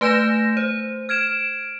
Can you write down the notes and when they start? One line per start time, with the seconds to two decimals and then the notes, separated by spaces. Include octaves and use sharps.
0.01 A3 B4 G#5 G6 A#6 E7
0.57 C5
1.09 F6 G#6 D7 E7